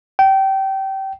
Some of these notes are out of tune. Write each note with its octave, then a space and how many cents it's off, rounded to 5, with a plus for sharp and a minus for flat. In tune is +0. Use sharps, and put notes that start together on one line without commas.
G5 -25